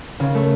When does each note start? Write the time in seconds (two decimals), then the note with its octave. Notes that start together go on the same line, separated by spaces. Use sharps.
0.20 C#3
0.35 A3